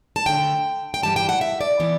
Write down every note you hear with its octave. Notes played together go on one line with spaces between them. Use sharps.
A5
F#2 D3 A3 G5
G5
G2 E3 G3 A5
G5
F#5
E5
D5
E3 B3